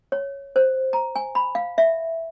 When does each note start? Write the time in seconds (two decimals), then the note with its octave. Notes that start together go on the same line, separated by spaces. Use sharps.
0.12 C#5
0.56 C5
0.93 A#5
1.16 G#5
1.35 B5
1.55 F5
1.78 E5